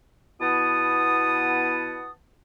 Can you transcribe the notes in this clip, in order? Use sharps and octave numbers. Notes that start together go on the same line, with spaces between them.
B2 B3 E4 F#5 A5 D#6